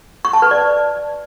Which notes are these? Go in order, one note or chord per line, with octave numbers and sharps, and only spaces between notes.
C#6
A5
B4
D5